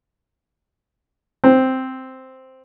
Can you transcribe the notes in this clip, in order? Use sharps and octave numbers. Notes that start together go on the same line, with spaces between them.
C4